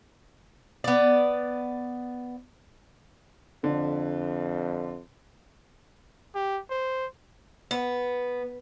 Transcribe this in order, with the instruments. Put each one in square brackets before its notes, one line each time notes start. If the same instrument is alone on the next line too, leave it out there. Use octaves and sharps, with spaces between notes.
[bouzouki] B3 D5
[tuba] F2 [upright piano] D3
[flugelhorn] G4
C5
[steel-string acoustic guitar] B3